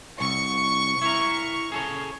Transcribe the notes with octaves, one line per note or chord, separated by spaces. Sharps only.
C2 C#6
E4 A#4
G#4 A4 C#5